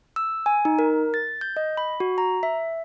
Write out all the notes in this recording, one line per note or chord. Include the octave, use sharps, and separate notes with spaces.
E6
G#5
D#4
A#4
A6
G6
D#5
B5
F#4
A#5
E5